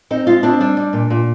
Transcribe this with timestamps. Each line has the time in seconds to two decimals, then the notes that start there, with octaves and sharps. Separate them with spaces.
0.11 C4 D#4
0.27 G#3 F4
0.43 C4 D4
0.60 G3 D4
0.77 G3
0.93 A#2
1.10 A#2